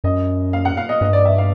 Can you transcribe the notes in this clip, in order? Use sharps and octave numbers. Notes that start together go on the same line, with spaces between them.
F#2 D#5
F5
F#5
F5
D#5
G2 D#5
D5
E5
F5